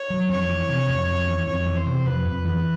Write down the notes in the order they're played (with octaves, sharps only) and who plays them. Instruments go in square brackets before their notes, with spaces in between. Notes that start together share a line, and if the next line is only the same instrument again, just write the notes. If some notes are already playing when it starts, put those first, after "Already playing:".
Already playing: [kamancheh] C#5
[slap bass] F#3
[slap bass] F2 [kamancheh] C#5
[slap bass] E3
C3
F2
F2
E3
[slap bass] F2 [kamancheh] C#5
[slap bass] E3
[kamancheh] C5
[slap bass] C3
[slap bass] F2 [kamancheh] B4
[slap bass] F2
E3